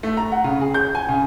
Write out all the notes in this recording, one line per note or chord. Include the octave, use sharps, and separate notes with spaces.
A3
A#5
F#5
C#3
G#4
G6
G#5
C#3